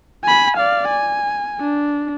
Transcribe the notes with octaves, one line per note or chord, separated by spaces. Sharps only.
G#5 B5
D5 F5
G#5
D4